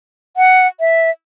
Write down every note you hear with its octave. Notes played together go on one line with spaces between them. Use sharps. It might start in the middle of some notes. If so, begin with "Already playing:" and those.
F#5
E5